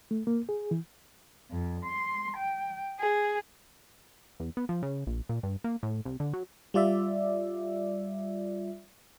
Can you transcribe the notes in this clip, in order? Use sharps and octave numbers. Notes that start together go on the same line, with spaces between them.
A3
A#3
G#4
E3
F2
C6
G5
G#4
E2
B3
F3
C#3
A#1
A#2
G2
A#3
A2
C2
D3
F#3
G3 F4 D5 E5